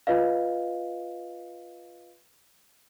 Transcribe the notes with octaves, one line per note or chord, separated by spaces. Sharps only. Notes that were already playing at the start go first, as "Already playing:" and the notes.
F4 B4 D#5 F5